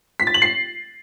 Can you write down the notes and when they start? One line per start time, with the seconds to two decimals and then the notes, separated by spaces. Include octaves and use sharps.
0.20 B6
0.27 A6
0.34 F#7
0.42 C7